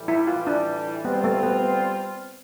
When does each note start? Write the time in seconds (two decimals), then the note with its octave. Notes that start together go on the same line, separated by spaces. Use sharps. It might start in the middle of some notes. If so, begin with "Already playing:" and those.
Already playing: A2 E3 G3
0.08 E4
0.27 F4
0.47 D4
1.04 G3 B3 C4 F4
1.24 A3
1.43 B3